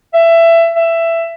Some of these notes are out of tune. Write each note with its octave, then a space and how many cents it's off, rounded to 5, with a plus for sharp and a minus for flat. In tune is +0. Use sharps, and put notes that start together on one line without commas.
E5 +20
E5 +15